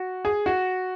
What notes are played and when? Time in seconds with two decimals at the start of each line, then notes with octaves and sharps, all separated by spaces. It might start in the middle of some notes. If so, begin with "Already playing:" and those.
Already playing: F#4
0.25 G#4
0.46 F#4